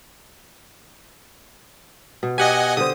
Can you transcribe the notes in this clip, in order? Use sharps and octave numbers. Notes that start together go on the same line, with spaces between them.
B2
G4 D#5 F#5 G#5
D3 C5 D#6